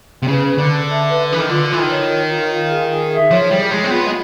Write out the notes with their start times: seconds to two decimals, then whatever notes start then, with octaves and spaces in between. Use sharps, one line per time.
0.23 C3
0.27 C#3 B4
0.47 B4
0.58 D3
0.69 A5
0.89 E5
1.09 B4
1.29 E3 B4
1.40 D#3
1.49 D3 F4
1.68 E3 F4
1.80 D#3
1.89 C#5
2.09 A#4
2.29 F4
2.49 F4
2.70 G#4
2.89 G#4
3.10 E5
3.30 F3 C#5
3.50 G3 G#4
3.71 G#3 G#4
3.84 C4
3.90 B3 F4
4.07 G#3